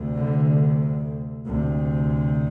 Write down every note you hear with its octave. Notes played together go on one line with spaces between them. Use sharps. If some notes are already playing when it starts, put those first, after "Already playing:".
Already playing: D2 C3
D3
D2 C3